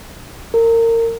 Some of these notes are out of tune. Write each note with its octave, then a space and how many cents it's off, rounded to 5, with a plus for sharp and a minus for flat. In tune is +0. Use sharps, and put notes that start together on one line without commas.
A#4 -25